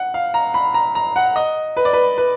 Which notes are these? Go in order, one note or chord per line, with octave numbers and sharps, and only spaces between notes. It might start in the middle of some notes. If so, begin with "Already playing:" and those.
Already playing: F#5
F5
A#5
B5
A#5
A#5
F#5
D#5
B4
D5
B4
B4